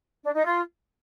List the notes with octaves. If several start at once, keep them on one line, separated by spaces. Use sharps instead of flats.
D4
D#4
F4